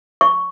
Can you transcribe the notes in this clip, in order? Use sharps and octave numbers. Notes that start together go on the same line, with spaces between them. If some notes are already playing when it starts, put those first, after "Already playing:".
C#6